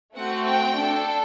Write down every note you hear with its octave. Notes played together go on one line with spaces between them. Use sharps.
A3 C4 F#4 F#5
G5
D4 A4